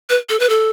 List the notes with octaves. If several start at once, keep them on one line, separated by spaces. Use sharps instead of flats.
B4
A4
B4
A4